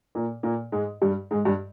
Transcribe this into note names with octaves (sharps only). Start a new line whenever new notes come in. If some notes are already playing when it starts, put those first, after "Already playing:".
A#2 A#3
A#2 A#3
G#2 G#3
G2 G3
G#2 G#3
G2 G3